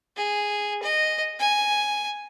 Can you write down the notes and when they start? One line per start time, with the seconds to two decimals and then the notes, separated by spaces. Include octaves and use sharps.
0.16 G#4
0.83 D#5
1.39 G#5